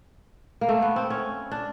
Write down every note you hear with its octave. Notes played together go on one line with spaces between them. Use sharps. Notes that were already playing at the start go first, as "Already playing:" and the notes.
A#3
A3
B3
C4
C#4
D4